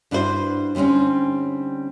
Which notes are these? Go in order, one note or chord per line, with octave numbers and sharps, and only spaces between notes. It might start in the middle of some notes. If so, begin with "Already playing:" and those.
G2 D4 E4 F#4 A4 C5
D3 G3 C4 C#4 D#4